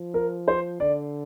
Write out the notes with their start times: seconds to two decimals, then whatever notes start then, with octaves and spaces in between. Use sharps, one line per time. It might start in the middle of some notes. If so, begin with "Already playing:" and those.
Already playing: F3
0.14 A#4
0.48 C5
0.80 D3 D5